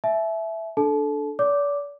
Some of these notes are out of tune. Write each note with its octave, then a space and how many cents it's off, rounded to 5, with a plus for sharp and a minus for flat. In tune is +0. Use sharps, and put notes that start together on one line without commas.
E5 +0 A5 -45
D4 +0 A4 -15 A5 -30
D5 -40 D6 +0